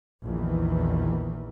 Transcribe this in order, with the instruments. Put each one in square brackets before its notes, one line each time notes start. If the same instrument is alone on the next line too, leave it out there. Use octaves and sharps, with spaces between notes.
[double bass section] A#1 E2 D#3 E3